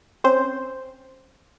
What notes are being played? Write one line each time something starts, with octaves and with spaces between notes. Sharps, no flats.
C4 C#4 C5